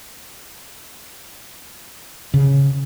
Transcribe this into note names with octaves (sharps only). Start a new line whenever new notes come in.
C#3